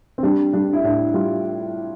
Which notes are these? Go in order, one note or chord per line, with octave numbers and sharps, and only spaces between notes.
C4
G3 D4
G3 D4
E4
A2 D4
G3 F4